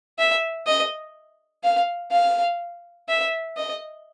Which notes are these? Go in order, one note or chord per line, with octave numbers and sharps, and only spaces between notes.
E5
D#5
F5
F5
E5
D#5